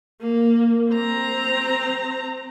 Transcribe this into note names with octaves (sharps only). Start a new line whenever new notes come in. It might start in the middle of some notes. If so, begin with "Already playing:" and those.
A#3
C4 A#5